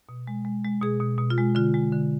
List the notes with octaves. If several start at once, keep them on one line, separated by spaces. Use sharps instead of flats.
B2
G#3
G#3
G#3
B2 G#4
B2
B2
F4
G#3
D3 F4
G#3
D3